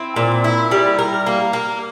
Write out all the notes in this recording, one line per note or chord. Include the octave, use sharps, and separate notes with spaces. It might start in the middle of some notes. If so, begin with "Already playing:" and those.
Already playing: C4 E4
A#2
E4
G3
A#4
A#3
A#3